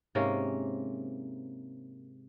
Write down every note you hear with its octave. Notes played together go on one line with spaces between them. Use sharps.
G#2 C3 A#3 C#4